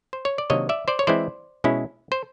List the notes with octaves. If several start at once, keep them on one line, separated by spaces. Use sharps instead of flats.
C5
C#5
D5
C3 D#3 F#3 A#3 D4 C#5 D#5
D5 E5
C5 D5
C#5
E3 G#3 C4 E4 C5 D5
B2 G#3 C#4 E4
C5